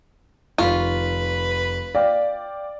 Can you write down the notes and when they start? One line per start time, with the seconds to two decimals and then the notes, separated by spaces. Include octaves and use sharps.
0.58 F1 D#3 F4 B4 C#6
1.95 D5 F5 G5 F6